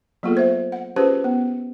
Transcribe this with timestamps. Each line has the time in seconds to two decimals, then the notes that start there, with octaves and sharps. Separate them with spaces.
0.23 F#3 A#3 B3 F4 G#4 A4
0.37 C5 E5
0.72 F#5
0.96 C#4 F4 G4 G#4 B4 C5
1.24 B3